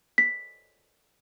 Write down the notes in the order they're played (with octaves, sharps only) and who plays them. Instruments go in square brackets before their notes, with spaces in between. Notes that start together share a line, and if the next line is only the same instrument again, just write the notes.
[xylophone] B6